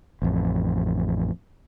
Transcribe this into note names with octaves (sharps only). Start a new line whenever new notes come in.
A1 F2